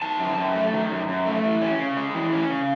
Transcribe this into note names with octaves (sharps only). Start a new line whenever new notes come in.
D#3 A5
F#2
F#2
A3
D#3
F#2
F#2
A3
E3
C#4
C#3
G#3
E3
C#4
C#3